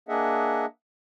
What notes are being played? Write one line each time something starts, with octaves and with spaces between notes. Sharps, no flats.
A#3 D4 G#4 D#5 E5 F#5